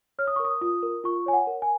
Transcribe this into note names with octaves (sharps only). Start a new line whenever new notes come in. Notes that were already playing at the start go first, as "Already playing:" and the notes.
C#5 F6
D#6
A#4 C#6
D#6
F4 D#6
A#4
F4 C#6
C#5 G#5
F#5
A#4
G#5